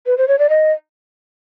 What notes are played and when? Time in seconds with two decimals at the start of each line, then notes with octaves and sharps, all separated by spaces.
0.06 B4
0.18 C5
0.28 C#5
0.39 D5
0.49 D#5